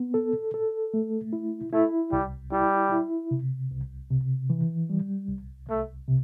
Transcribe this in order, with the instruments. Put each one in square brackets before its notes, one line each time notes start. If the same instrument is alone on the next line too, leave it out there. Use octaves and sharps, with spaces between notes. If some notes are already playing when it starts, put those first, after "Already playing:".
Already playing: [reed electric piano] B3
A4
A4
A3
E4
[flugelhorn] A3 [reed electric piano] E4
[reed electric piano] C2 [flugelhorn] G3
[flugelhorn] G3 [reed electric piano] E4
[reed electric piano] E4
C3
C2
C3
E3
G3
C2
[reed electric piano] C2 [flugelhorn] A3
[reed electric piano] C3